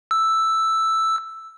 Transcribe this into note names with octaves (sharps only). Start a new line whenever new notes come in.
E6